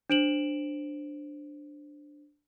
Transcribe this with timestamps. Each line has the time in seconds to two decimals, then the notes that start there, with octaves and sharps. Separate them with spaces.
0.10 D4 C5 D7 E7 F#7